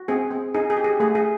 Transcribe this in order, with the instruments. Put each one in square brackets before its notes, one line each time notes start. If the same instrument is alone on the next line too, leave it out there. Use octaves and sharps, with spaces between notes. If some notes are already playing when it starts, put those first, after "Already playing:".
Already playing: [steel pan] F#4
C4 G#4
C4
D#4 G#4
G#4
G4
G#4
A3 G#4
G#4